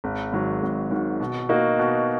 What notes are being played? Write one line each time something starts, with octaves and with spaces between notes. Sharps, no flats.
G#1
G#2 D#3 F#3
G#1
G#2 D#3 F#3
B2
A#3 D#4 F#4
B2